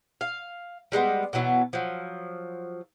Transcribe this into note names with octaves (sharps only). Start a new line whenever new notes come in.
F5
G3 G#3 A#3 B3
B2 E3 F#3 B3
F3 F#3